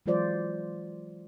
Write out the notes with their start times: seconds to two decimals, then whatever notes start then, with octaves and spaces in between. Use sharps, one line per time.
0.06 E3 F#3 G#3 F4 C5 D5